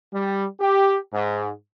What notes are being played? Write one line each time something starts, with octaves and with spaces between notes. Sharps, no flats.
G3
G4
G#2